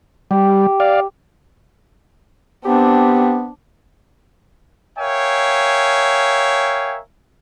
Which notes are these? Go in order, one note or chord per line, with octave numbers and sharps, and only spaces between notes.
G3 G4
D5 F5
B3 C4 D4 G4
A#4 C#5 E5 F5 G5 G#5